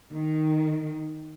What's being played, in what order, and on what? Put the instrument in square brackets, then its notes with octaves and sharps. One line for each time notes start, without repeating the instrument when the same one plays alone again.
[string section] D#3